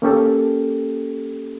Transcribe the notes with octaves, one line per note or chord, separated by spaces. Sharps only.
A#3 C#4 G4 A4